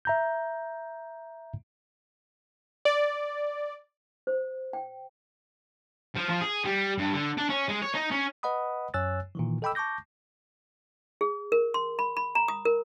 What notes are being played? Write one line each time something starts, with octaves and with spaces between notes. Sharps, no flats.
E5 A#5 G6
D5
C5
G5
F3
F3
G#4
G3
G2
D3
D4
C#4
G#3
C#5
D#4
C#4
B4 D#5 F#5 B5 D#6
F#2 C#5 G#5 E6 F#6 A6
A#2 D#3 E3
A4 D#5 G5 B5 D6 E6
A5 C#6 D6 G6 A#6
G#4
A#4
C6
B5
B5
A#5
D#6
A#4